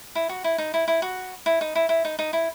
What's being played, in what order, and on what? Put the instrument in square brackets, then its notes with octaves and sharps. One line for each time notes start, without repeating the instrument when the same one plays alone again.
[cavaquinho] E4
F#4
E4
D#4
E4
E4
F#4
E4
D#4
E4
E4
D#4
D#4
E4